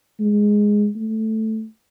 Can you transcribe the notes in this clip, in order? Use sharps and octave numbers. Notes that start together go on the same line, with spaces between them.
G#3
A3